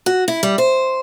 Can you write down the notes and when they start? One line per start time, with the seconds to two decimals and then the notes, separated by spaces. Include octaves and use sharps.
0.06 F#4
0.28 E4
0.43 G3
0.58 C5